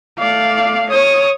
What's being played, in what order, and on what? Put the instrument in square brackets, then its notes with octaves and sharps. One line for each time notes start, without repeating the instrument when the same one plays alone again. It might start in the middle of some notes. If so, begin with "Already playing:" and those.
[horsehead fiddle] A3 F5 [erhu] D5
[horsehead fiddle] C#5 [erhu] D#6